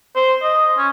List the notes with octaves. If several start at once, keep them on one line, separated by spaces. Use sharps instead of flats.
C5
D#5
C#4